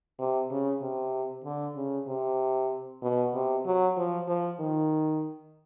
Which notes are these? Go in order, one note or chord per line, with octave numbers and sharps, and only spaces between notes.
C3
C#3
C3
D3
C#3
C3
B2
C3
F#3
F3
F3
D#3